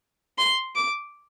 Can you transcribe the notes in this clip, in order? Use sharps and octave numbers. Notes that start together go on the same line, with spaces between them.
C6
D6